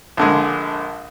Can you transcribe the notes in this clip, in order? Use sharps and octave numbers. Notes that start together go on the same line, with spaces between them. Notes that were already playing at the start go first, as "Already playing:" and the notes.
A#1 D3 G#3